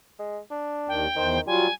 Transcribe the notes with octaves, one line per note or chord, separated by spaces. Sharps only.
G#3
D4
D#2 D#3 G5
E2 D#3 C5
F#3 G3 F4 G#5